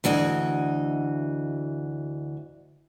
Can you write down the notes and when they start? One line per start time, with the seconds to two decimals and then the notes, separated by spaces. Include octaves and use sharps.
0.04 D2 E3 F#4 D#5